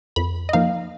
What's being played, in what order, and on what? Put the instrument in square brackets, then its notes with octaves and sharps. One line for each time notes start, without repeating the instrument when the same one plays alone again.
[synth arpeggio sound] F2 B5
D#5
F3 A#3 D#4 F5